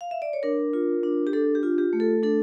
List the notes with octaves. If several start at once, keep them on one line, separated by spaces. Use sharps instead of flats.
F5
E5
D5
C#5
D4 A#4
F4
D4
G4
D4 A4
G4
F4
G4
A3
A4
D4 A4